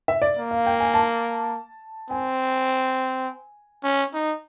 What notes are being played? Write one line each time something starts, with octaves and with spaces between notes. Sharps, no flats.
E5
D5
A#3
F5
G5
G#5
A5
C4 G#5
C#4
D#4